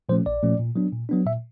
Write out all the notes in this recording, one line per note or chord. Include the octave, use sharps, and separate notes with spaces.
A#2 F3 A3 C#4 C5
A#1 D5
A#2 F3 A3 C#4
A#2
F#3 B3 D4
A#2
F#3 B3 D4
A#2 E5